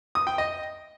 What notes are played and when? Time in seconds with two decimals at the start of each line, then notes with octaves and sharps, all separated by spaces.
0.15 D#6
0.27 G5
0.38 D#5